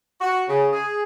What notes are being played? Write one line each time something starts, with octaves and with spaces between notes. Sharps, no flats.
F#4
C#3
G#4